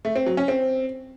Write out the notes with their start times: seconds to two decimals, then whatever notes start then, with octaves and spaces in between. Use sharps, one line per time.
0.05 A3
0.16 C4
0.26 F#3
0.37 C#4
0.48 C4